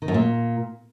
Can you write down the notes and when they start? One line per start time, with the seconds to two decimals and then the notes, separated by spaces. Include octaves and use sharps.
0.02 D#3
0.08 F#2
0.14 A#2